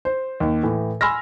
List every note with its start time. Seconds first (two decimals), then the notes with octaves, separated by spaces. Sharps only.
0.05 C5
0.40 D#2
0.63 A2 E3
1.01 G#5 B5 C6 E6 F6 A#6